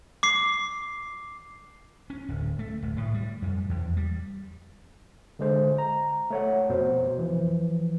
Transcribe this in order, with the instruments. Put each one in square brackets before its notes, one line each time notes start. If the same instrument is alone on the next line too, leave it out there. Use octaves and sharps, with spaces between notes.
[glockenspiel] D6 C7
[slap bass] C#4
D1
A3
D1
A2
G3
F2
E2
G3
[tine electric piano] D3 G#3 C5
A#5
A3 C#5 F#5
F2 B2 C5
E3 F3